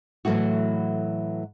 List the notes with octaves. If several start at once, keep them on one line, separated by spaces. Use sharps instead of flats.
A2 E3 F#3 A3 E4 F#4